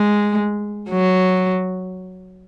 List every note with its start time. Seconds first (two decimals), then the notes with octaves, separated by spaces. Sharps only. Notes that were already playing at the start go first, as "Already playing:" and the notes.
Already playing: G#3
0.90 F#3